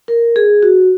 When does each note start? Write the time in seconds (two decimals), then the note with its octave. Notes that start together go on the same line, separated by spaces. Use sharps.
0.08 A#4
0.36 G#4
0.63 F#4